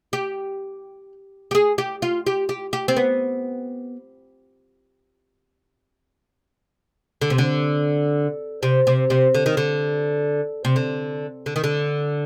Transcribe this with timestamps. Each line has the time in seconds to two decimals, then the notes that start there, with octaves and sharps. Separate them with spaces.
0.13 G4
1.51 G4
1.55 G#4
1.78 G4
2.02 F4
2.27 G4
2.49 G4
2.73 G4
2.88 C4
2.97 B3
7.21 D3
7.30 C3
7.38 D3
8.63 C3
8.87 C3
9.10 C3
9.35 D3
9.46 D#3
9.57 D3
10.65 C3
10.76 D3
11.46 D3
11.56 D#3
11.64 D3